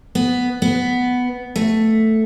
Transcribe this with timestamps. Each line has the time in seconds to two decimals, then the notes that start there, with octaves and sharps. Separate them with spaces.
0.15 B3
0.62 B3
1.56 A3